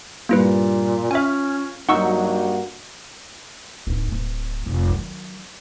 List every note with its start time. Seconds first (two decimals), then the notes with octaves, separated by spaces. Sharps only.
0.29 G2 A#2 A#3 E4 B4
1.11 C#4 F4 E5 G#5 F6
1.89 G2 F#3 A#3 D#4 F#4 F#5 C#6 E6
3.87 D1 D#4
4.12 D1
4.66 F1
4.90 D#3 F#3